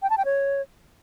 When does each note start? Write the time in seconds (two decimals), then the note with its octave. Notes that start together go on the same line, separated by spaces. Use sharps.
0.02 G5
0.10 A5
0.18 G5
0.25 C#5